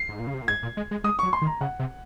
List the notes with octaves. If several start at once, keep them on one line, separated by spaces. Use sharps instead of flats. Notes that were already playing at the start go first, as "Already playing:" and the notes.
Already playing: C7
G#2
A#2
C#3
C3
A#2
G#2 G#6
A#2
G#3
G#3
G#3 D#6
F#3 C#6
C6
D#3
A#5
C#3 F#5
C3